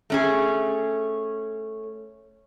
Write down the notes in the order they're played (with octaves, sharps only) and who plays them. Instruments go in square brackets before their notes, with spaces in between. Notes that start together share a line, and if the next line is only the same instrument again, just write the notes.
[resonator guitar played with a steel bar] A3 C#4 G#4